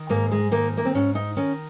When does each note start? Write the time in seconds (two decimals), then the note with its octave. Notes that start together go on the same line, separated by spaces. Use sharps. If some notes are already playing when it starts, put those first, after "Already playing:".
Already playing: D#3
0.09 G#2 A#3
0.31 G#3
0.51 D#3 A#3
0.77 A#3
0.85 C4
0.95 G#2 C#4
1.15 D#4
1.37 D#3 C#4